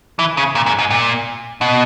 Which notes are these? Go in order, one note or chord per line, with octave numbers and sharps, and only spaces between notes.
E3
C#3
A#2
G#2
G#2
A#2
B2